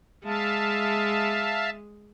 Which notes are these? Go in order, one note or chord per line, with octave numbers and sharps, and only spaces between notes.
G#3 E5 F5 A5